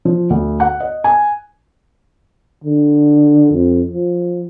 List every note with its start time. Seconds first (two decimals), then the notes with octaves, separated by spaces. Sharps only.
0.05 F3
0.30 D2
0.60 F#5
0.80 D#5
1.04 G#5
2.64 D3
3.52 F2
3.92 F3